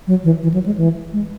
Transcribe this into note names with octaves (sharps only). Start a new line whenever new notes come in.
F#3
E3
E3
F#3
G#3
E3
G#3